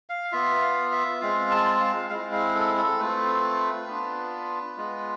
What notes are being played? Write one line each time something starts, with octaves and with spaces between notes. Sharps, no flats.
F5
B3 F4 E5
F5
E5
G#3 C4 F4 F5
A5
F5
G#3 C4 E4 F5
F5
A4
A4
A3 C4 F4 B4
B3 D4 F4
G#3 B3 F4